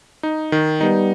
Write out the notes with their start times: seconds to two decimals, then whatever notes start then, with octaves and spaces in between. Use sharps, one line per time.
0.23 D#4
0.52 D#3
0.80 G3 B3 D#4